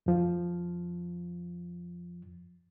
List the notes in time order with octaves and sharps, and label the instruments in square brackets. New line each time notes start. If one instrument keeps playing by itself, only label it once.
[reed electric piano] F2 F3